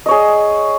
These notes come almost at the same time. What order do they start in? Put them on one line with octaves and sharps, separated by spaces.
D#5 C#5 G#4